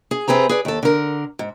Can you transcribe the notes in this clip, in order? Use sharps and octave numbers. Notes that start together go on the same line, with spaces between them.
G#4
C3 C4 G#4 B4 A#5
G#4 B4 D5
D#2 A4
D3 A#4
G#2